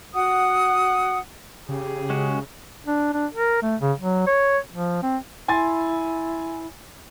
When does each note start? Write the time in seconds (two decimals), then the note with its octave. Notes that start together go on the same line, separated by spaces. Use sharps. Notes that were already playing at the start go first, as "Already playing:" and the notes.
0.14 F#4 F#5 D#6
1.69 C#3 G4 G#4
2.10 G#3 C#4 F#4
2.87 D4
3.14 D4
3.34 A#4
3.63 A3
3.81 C#3
4.00 F#3
4.27 C#5
4.72 F3
5.03 C4
5.48 E4 G#5 C6 A6